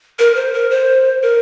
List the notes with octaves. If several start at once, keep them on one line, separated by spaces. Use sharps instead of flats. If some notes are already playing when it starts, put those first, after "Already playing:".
A#4
C5
A#4
C5
A#4